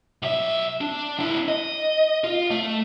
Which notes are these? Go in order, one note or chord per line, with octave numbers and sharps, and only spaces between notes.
B1 E5
D4
D4 E4
D#5
F4
A3